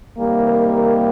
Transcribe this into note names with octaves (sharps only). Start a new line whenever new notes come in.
C3 D#3 G3 A#3
A#4
A#4